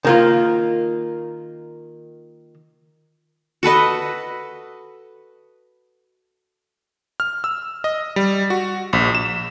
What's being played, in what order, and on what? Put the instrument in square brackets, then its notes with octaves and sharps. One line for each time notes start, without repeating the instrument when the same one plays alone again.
[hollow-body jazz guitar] D#3 A#3 F4
[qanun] F#4 A4 B4 D#5
[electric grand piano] F6
E6
D#5
G3
F#4
A#1
E7